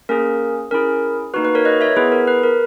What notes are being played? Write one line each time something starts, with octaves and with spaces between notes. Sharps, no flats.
A#3 C#4 G#4 A#4
C#4 E4 G#4 A#4
A#3 D#4 F#4 B4
B4
A#4 C#5
B4 D#5
C#5 E5
B3 E4 G#4 B4
A#4
B4
A#4